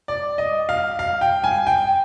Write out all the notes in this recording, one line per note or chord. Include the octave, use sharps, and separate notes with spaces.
D5
D#5
F5
F5
G5
G#5
G5